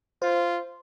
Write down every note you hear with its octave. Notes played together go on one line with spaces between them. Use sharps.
F4 C5